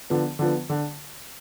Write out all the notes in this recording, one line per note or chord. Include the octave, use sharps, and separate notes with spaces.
D3 F3 B3
D3 F3 B3
D3